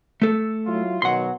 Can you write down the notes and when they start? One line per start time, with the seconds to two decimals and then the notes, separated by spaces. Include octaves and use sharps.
0.22 A3 A4
0.67 F#3 E4 F4
1.02 B2 D#3 F#3 F#5 C6